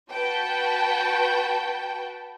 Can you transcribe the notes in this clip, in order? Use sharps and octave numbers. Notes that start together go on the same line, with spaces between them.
F#4 B4 G5 A5